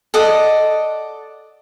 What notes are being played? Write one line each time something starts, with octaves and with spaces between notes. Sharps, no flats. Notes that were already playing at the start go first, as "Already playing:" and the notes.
A4 D5 D#5 F#5